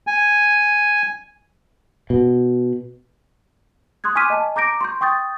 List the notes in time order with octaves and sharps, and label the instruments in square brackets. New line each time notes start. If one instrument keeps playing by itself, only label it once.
[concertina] G#5
[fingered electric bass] B2
[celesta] C6 D#6 F#6 G#6
G#5 C#6 D6 F6 B6 D#7
D#5 G#5 A5
A#5 D6 G6 A#6 D7
C6 C#6 G6
G5 C#6 D#6 G6 A6